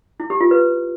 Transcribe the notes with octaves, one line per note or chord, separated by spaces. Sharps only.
E4
G4
F4
B4